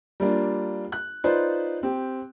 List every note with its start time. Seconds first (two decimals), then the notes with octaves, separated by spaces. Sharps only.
0.20 G3 A#3 D4 F4
0.92 F#6
1.24 D#4 F4 B4 C5 D5
1.83 C4 G4